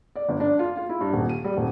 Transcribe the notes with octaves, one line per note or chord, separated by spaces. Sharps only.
D5
G1
D4
F4
F4
E4
G2
D#1
D#7
G3
D#1